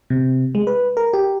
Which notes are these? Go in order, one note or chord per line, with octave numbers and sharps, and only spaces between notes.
C3
G#3
B4
A#4
G4